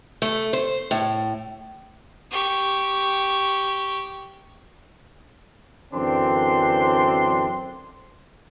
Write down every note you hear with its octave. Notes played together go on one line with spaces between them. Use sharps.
A3
C5
A2
G4 C#6
F#2 D3 E3 C4 D4 C6